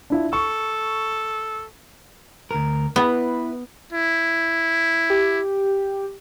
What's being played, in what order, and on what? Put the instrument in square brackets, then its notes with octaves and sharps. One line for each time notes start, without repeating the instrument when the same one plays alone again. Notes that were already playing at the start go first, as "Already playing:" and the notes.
[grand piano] D4 E4 F4
[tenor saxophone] A4 [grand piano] C#6
[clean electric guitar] D2 A#4
[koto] B3 [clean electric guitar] E4 B4
[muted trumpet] E4
[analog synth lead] G4